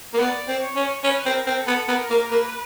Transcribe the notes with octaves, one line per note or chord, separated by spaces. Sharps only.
A#3
B3 D5
C4
C#5
C#4
C#4 B4
C4
A#4
C4
A4
B3
B3 A#4
A#3
A#3 B4